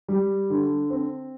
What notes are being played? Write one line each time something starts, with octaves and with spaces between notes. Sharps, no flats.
G3
D3
C4